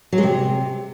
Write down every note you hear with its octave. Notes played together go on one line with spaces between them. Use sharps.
F#3
G#3
C3